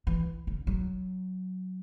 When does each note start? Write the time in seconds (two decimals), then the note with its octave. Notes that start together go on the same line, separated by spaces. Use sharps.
0.07 E3
0.47 C#3
0.67 F#3